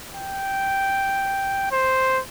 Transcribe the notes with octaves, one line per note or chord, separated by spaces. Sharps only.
G5
C5